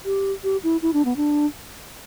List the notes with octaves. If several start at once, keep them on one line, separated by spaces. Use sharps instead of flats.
G4
G4
E4
E4
D4
B3
D4